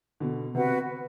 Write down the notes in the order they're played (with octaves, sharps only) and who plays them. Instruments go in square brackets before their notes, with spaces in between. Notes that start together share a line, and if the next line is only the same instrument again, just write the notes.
[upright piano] B2 D3
[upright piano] C3 [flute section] F#4 B4 F#5